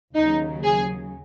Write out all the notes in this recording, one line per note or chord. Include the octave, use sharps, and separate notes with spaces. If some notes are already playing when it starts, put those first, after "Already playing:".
D#2 C#3 F#3 D#4
G#4